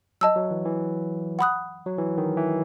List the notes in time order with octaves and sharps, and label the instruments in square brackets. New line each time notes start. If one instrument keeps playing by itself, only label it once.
[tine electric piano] F#3 [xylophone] D#5 A5 E6
[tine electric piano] F#3
E3
E3
[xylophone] F#5 B5 D#6 F#6
[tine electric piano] F#3
E3
D#3
E3